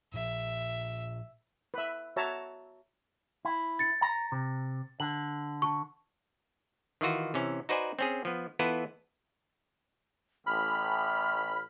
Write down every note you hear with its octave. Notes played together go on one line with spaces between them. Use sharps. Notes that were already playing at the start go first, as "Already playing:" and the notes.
A#2 F3 E5
B4 E5
F#4 C#5 E5 A5 A#5
E4
A6 C#7
A#5
C3
D3 F#7
A5 C#6
D#3 E3 F4 F#4
C3 E3 C#4
D#4 F#4 B4 C5 D5 G#5
C4 C#4 G#4
F3 B3
E3 B3 E4 F4 A4 B4
A1 B5 F6